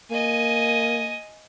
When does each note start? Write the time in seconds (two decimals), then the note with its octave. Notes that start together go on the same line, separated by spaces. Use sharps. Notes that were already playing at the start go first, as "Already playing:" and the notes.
0.11 A#3 D#5 G#5